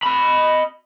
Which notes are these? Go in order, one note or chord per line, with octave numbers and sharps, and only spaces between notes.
D#5 B5